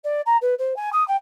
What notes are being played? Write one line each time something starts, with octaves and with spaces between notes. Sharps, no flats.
D5
A#5
B4
C5
G#5
D#6
G5